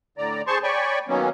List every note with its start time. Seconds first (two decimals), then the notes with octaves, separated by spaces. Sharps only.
0.18 A2 D3 D5 A#5
0.47 G#4 C5 A5 C6 C#6
0.63 C#5 D5 G5 G#5 B5 C#6
1.08 D#3 F#3 A#3 B3 C#4